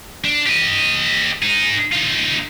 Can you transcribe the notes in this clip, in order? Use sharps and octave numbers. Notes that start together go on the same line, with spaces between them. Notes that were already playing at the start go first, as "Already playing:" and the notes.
D4
G4 D#5
D#4 G#4
D#4 F4